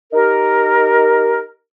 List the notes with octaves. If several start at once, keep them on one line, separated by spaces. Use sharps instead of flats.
D#4 G4 A#4